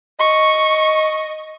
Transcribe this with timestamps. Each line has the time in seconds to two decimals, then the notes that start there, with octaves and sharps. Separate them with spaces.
0.20 D#5 C#6